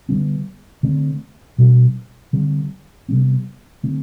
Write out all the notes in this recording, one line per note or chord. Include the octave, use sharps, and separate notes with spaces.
D3 G3 B3
D3 A3 C4
B2 G3 D4
D3 G3 C4
C3 G3 B3
D3 A3 C4